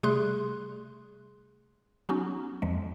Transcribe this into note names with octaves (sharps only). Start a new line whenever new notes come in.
C3 G3 A3 G#4 C6 F#6
F#3 B3 C#4 D#4 F#4
F2 F3 G#3